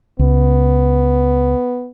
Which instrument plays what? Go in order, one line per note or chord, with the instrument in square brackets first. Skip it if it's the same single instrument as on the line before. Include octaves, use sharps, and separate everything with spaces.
[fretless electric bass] C#2 [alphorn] B3